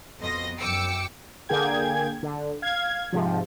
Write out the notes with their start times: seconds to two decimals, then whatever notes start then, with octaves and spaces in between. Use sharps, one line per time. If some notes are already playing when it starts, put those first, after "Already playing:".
0.19 F2 B2 D#5 C6 A#6
0.59 F#2 G5 D6 E6 C#7
1.49 D3 A#3 G#4 G5 G#6
2.23 D3
2.62 F5 G#6
3.13 G#2 C3 F3